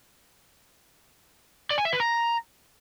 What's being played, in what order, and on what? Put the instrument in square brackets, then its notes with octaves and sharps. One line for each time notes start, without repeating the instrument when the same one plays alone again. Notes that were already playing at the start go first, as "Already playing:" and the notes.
[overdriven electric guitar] D5
G#5
E5
B4
A#5